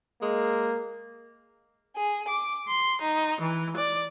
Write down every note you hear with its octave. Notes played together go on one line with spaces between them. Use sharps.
G#3 A#3
G#4
D6
C6
D#4
E3
D5